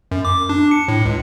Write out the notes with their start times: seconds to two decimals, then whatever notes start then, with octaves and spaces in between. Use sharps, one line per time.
0.11 F#2
0.25 D6
0.49 D4
0.71 C#7
0.88 A2
1.05 C#2